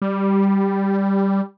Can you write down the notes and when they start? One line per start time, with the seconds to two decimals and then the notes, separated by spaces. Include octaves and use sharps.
0.02 G3